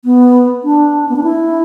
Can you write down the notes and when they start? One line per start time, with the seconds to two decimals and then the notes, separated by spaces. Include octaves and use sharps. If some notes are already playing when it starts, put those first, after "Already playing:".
0.05 B3
0.64 D4
1.09 B3
1.16 D4
1.23 E4